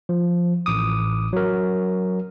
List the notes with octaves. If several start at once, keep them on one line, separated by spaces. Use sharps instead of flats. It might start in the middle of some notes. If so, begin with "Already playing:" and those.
F3
A1 D6 D#6
F#3 A#4